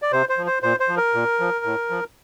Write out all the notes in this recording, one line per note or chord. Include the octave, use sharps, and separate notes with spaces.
D5
C3 C5
C5
F3
C5
A#2 C5
C5
F3
A#4
A#2
F3
A2
F3